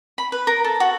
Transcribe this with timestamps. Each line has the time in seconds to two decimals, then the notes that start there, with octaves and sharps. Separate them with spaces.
0.18 B5
0.32 B4
0.47 A#4
0.64 A4
0.80 F#4